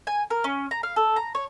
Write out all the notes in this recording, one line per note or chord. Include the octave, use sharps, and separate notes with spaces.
G#5
A#4
C#4
A#5
F5
A4
A#5
C#5